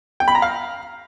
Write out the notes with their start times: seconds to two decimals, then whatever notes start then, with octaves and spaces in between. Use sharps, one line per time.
0.20 G5
0.28 B5
0.35 A#5
0.42 F5